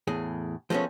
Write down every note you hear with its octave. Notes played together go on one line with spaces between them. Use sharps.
E2 A2 G#4
F3 G#3 A3 B3 C#4